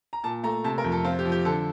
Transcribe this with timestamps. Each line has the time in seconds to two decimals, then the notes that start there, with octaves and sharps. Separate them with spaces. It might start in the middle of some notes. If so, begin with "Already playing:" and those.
0.13 A#5
0.24 A#2 A5
0.43 A3 A#5
0.64 C3 A5
0.78 A#4
0.84 F2
0.92 A4
1.05 C4 F4
1.19 G4
1.25 F3
1.32 G4
1.45 D3 A4